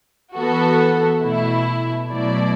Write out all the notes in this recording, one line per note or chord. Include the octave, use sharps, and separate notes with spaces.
E3 B3 F#4 A4
B2 A3 E4
B2 F#3 A3 E4 D5